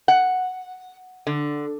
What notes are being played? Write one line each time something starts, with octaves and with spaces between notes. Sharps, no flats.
F#5
D3